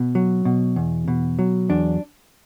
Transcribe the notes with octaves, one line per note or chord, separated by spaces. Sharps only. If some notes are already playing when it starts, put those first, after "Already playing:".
Already playing: B2
F#3
B2
E2
B2
F#3
E2 D4